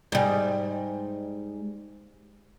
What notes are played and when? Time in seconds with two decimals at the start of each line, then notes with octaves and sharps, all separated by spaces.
0.12 G#2 G3